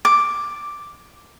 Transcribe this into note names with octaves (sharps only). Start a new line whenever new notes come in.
D6